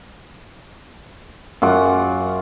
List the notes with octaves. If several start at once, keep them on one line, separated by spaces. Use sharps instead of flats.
F#2 F4 F#5 D6